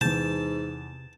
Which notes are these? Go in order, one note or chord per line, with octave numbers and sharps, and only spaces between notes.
E2 G#2 C3 A5 G6